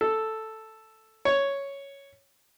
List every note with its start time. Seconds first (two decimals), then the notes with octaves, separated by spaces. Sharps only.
0.01 A4
1.25 C#5